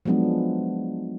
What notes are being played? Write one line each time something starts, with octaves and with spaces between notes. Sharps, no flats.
F3 F#3 G#3 B3 D4